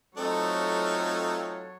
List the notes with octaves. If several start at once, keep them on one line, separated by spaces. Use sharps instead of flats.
F#3 A3 C4 D#4 F4 A4 C#5